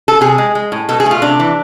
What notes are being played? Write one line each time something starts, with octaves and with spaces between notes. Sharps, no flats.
A4
C3 G#4
G#3
G#3
A2
B2 A4
G#4
A3
F4
C3 D4
E3